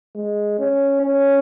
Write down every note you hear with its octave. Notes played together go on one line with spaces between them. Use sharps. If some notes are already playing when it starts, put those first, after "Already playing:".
G#3
C#4
C#4